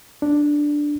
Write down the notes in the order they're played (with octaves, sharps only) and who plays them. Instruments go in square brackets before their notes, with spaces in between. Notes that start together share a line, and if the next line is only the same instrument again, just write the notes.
[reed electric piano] D4